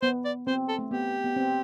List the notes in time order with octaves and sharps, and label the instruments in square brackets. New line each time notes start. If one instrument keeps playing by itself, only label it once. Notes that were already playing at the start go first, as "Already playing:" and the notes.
[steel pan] B3 [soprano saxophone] C5
[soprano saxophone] D5
[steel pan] C4 [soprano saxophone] C5
[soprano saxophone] A4
[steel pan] A3
[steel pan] B3 [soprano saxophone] G4
[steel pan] B3
C4